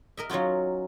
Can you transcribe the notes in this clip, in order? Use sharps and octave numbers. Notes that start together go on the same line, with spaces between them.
A#4 D#5 E5
F#3 C#4 D#4 F4 F#4